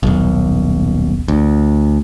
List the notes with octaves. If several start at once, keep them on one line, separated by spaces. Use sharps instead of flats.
D#1 B1
D2